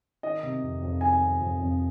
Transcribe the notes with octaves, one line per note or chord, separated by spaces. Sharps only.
D#3 D#5
C3
F2
F2
D#3 G#5
C3
F2
F2